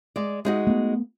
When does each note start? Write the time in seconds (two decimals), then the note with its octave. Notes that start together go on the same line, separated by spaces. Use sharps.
0.16 G#3 D5
0.45 G#3 D#4 F#4
0.67 A3 B3